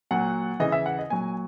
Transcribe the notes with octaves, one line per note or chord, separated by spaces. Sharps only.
A#2 F#3 F#5
C#3 E3 D#5
E5
F#5
D#5
A#2 F#3 G#5